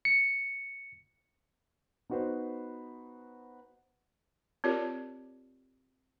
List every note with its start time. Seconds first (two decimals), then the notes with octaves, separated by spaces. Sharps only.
0.05 C#7
2.10 B3 D#4 F#4 B4 C5
4.64 C4 F4 G4 A#4 C#5 D5